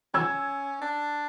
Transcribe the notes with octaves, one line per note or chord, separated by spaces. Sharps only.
C#4 E6 G#6
D4